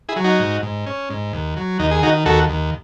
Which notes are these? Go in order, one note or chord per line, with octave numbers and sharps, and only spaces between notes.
E4 G#4
F#3
D#4 F#4
G#2
G#2
C#4
G#2
D#2
F#3
D#2 D#4
G#4
D#3 D#4 F#4
D#2 F#4 A4
D#2